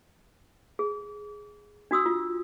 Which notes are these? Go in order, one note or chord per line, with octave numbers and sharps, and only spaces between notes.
G#4
D4 F#4 D#6 E6
F4